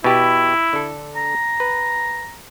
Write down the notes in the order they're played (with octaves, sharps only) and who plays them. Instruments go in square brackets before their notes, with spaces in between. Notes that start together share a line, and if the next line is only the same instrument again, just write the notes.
[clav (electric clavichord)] B2 G4 [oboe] E4
[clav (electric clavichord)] D3 A4
[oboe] A#5
[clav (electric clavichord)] B4